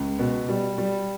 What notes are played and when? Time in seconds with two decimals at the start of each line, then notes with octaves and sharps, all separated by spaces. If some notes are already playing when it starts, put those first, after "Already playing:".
Already playing: C#2
0.19 B2
0.49 G3
0.78 G3